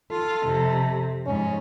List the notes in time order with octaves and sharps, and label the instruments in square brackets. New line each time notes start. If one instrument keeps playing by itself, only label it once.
[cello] F4 [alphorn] A4
[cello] F2 C3
[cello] F2 G#2 [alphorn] C#4